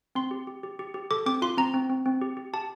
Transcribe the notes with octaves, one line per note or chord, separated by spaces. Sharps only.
C4 C6
G4
G4
G4
G4
G4
A4 D6
C4 D6
F4 C6
C4 A#5
C4
C4
C4
G4
G4
G4 A5